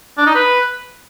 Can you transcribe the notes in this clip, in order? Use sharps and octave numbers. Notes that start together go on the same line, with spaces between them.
D4
D#4
B4